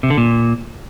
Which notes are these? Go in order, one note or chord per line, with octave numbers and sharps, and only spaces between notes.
C3
D3
A#2